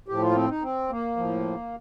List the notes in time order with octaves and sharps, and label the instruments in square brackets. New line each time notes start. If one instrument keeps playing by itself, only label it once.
[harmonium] A2 F3 G4
F4
A#3
C4
D#4
C4
A#3
A2 F3